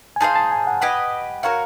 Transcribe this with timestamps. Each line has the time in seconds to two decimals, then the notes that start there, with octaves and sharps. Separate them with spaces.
0.16 G#5
0.20 D#4 G#4 C5 F5 A5
0.35 A5
0.52 G#5
0.67 F#5
0.81 G4 B4 D#5 F#5 G#5
1.43 F#4 A#4 C#5 F5 F#5